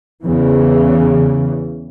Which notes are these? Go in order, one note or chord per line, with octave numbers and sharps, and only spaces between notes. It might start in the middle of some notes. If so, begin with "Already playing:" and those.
E2 C#3 E3